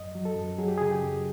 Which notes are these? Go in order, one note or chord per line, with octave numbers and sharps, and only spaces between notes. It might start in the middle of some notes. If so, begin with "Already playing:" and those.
Already playing: F#2 D#5
F#3
A4
F#2
F#3 G#4
G4
C#3 G#4
G4
F#2